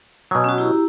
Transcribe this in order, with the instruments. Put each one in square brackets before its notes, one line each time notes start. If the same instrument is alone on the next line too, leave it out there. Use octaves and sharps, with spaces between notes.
[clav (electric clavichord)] B2 F#3 [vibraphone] G#5 D#6
[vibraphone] C#4 F#4
E4 G4 A#5